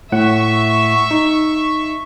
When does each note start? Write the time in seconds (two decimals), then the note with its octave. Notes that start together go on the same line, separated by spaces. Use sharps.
0.12 A2 E5 F#5 C#6
1.11 D#4